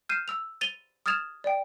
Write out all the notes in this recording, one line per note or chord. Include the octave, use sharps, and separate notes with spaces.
F6 G6 C7 D#7 E7
E6 F7
A6 D#7 F7 G7
D#6 F6 G#6 A6 E7 F7
D5 G5